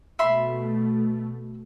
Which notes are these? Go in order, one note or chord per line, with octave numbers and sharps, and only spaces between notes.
B2 A3 E5 B5 C6